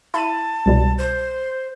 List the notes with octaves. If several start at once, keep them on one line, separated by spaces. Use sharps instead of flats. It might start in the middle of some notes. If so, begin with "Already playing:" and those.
E4 A5 B5 D#7
C2 B2 G3
C5